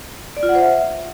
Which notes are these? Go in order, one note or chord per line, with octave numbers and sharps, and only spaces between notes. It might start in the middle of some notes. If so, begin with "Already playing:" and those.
D5
F4
F#5
C5
E5